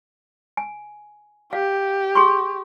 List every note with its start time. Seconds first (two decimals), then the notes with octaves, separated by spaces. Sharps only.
0.57 G#5
1.53 G4 F5
2.15 G#4 C6 C#6